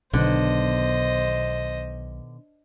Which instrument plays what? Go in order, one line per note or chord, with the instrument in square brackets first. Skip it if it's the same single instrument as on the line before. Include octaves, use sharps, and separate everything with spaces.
[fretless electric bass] B1 [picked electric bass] B2 D#3 B3 [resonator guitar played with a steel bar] D3 [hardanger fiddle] C5 D#5